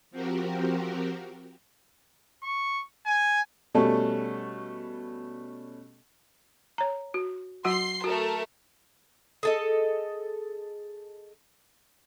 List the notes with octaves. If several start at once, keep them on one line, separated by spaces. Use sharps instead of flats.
F3 C4 F#4 G4 A#4
C#6
G#5
B2 G3 A3 C#4 A4
C#5 A#5
F#4
F#3 F#4 F#5 C6 C7
A3 F#4 A4 A#4
G#4 A4 D#5